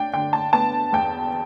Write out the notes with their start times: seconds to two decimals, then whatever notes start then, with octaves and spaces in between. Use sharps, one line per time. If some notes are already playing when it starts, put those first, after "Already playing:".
Already playing: D4 G5
0.13 D3 G5
0.33 A5
0.53 B3 A5
0.93 E2 G5